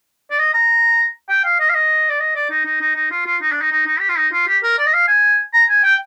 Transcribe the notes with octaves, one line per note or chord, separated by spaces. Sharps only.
D5
D#5
A#5
G5
F5
D#5
F5
D#5
D5
D#5
D5
D#4
D#4
D#4
D#4
F4
F4
D#4
D4
D#4
D#4
D#4
G4
F4
D#4
F4
G4
A#4
D5
D#5
F5
G#5
A#5
G#5
G5